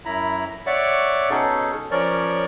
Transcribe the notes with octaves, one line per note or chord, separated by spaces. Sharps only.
F#2 E4 A#5 B5
C#5 D5 E5 F#5 D6
B2 C#4 D#4 G#4 A4
F3 C#4 A#4 C#5 D5